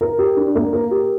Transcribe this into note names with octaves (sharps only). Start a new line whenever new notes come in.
A#4
G4
D4
A#3
A#4
G4